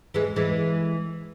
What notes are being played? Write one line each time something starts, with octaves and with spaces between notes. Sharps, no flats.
E3 G#3
E3 G#3